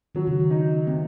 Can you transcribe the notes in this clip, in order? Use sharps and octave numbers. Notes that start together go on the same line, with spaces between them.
D#3 F#3
C#3
D#3
D#4
C3 A#3